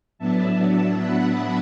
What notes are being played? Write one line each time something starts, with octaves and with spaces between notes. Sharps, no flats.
A2 F#3 B3 D4 E5 A5
F#5 B5